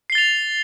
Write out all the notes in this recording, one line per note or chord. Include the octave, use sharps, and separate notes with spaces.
A6 C7 F7 G7